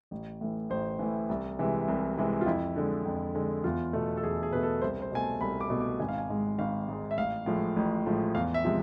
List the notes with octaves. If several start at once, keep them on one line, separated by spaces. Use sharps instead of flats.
A1
A2 E3
A1 C5
A2 E3
C2
C3 E3 G#3
C2
C3 E3 G#3
F4
F2 E4
D3 G#3
F2
D3 G#3
E2 F4
B2 A3
A4
E2 G#4
G#4
B2 A3 B4
A4
C2 C5
C5
B2 A3 G#5
A5
C2 B5
D6
B2 A3
D6
G#1 G#5
F5
G#5
G#2 G#3
G#1 F5
G#2 G#3
E5
A1 F5
A2 F3 G#3
A1
A2 F3 G#3
E2 F5
E5
C3 F3 G#3